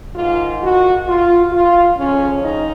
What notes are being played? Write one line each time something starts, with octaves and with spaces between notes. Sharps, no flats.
G#2 D#3 F4
F#4
F4
F4
F2 C#3 C#4
D#4